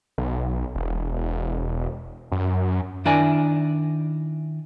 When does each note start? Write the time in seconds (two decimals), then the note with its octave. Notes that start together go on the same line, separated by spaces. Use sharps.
0.18 B1
0.75 E1
2.32 F#2
3.05 D#3 D4 E4 A#4 D5 G#5